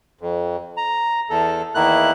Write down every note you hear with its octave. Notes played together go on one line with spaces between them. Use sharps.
F2
A#5
E2 A4
E2 D#3 A#3 E4 F#6